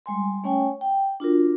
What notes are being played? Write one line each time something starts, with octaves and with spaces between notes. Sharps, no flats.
G3 G#3 G#5 C6
A3 C#4 C#5 G5 G#5
G5
D4 F4 F#4 A#4